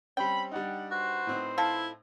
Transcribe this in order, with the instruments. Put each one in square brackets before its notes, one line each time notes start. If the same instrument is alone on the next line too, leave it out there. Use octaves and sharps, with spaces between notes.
[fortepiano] G3 C4 C#4 [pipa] G5 [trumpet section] B5
[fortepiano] G3 D4 D#4 [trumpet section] F#5
[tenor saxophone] F#4 [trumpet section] B4 C5
[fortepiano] A2 C4 D#4
[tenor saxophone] E4 [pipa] F4 A4